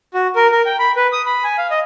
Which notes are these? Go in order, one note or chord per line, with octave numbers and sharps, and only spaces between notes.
F#4
A#4
A#4
G5
B5
B4
D#6
B5
G#5
F5
D#5